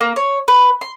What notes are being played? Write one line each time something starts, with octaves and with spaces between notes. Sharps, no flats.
A#3
C#5
B4
C6